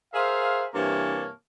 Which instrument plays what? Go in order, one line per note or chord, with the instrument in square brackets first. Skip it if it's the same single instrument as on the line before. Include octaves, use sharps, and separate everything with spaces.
[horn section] G#4 A#4 C5 E5 F5
G2 C3 E3 A#3 C#5 A5